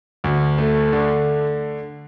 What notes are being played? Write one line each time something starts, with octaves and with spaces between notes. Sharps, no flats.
D2
A3
D3